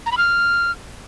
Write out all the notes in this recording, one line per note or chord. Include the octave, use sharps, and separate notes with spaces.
A#5
B5
F6